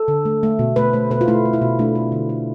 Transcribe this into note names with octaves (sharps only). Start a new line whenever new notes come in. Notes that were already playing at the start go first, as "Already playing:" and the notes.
Already playing: A4
D3
A3
A3
B2
A3 B4
A3 C5
B2 B4
F4
A3 E4
A3
E4
B2
A3 D4
A3
D3
A3